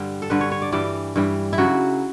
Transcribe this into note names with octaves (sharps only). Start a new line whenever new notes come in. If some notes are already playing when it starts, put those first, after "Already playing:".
Already playing: G2 D3 G3
A4
G2 D3 G3 B4
C#5
C#5
D5
G2 E3 G3 D5
G2 E3 G3
E4
C#3 F#3 F#4